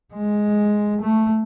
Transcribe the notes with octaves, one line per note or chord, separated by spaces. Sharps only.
G#3
A3